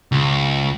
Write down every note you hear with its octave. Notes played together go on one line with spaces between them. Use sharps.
C#2